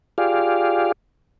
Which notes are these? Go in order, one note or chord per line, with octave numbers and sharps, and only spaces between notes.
F4 G4 G#4 D5 F5